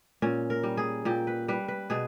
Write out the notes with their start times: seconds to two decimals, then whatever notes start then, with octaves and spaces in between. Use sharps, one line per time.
0.22 A#2 C#4
0.50 A#4
0.63 G3
0.77 G#4
1.05 A#2 G4
1.27 B4
1.48 G3 B4
1.68 B4
1.90 B2 G#4